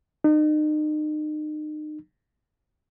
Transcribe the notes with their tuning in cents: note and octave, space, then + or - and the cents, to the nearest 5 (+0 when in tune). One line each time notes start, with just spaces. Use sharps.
D#4 -35